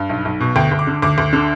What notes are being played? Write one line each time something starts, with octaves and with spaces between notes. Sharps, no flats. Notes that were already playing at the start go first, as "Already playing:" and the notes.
Already playing: G2
B1
B1
B2
D2 G5
D2
D6
D3
D2 D6
D2
D3